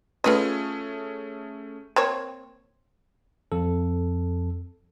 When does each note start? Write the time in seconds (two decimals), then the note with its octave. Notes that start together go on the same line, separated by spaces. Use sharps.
0.24 A3 C#4 F4 G#4 B4 D#5
1.96 A#3 C4 C#5
3.52 F2 A4